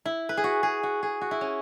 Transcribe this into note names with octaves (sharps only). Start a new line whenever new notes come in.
E4
B4
G#4
F#4
G#4
F#4
G#4
F#4
E4
C#4